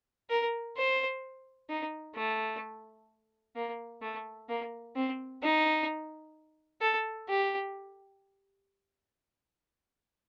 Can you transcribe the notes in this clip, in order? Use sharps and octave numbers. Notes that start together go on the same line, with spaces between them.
A#4
C5
D#4
A3
A#3
A3
A#3
C4
D#4
A4
G4